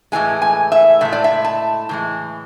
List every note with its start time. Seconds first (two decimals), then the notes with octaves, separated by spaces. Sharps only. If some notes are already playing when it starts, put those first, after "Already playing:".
0.12 A2 E3 G#3 G#5
0.42 G#5
0.72 E5
1.01 A2 E3 E5
1.05 G#3
1.13 D5
1.24 E5
1.44 A5
1.89 A2 E3 G#3